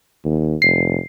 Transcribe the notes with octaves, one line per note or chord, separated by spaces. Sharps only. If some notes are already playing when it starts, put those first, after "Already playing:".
D#2
F1 C7